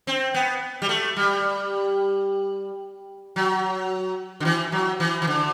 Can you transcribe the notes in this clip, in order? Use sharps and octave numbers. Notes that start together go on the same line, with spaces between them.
C4
B3
G3
A3
G3
F#3
D3
E3
F#3
E3
E3
D3